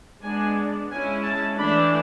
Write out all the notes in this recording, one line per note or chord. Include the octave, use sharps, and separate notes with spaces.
G#3 B3 D4 G#5
G#3 C#4 E4 G#5
A5
E3 A3 D4 B5